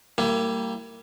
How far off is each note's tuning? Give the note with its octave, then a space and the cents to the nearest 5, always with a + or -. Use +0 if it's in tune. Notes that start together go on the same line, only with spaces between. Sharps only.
G3 -5 A#3 -30 E4 +25